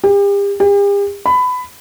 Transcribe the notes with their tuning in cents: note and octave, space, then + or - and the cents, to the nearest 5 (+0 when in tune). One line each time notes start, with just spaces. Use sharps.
G4 +40
G4 +45
B5 +20